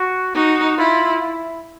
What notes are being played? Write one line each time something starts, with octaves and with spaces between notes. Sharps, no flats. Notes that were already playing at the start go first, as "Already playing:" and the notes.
Already playing: F#4
D#4 F#4
E4 F4
E4